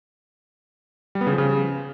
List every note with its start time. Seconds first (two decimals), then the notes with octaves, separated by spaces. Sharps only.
1.15 G3
1.21 B3
1.27 C#3
1.32 F3
1.38 C#3